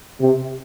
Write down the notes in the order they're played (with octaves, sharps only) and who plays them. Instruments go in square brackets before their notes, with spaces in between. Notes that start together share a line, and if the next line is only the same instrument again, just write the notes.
[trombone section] C3